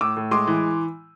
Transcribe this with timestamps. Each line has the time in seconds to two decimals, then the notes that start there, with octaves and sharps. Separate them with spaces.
0.01 A2 D6 E6
0.17 A2
0.31 G#3 C6 D6
0.47 E3